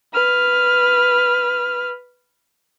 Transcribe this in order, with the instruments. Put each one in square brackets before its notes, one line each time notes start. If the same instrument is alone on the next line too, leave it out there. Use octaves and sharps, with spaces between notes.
[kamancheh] B4 F6